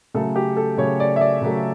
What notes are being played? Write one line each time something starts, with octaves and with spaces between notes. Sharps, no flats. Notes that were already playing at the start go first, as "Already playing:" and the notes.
C#3 F#3 A3 A4
G4
A4
C#3 F#3 A3 C#5
D5
E5
D5
C#3 F#3 A3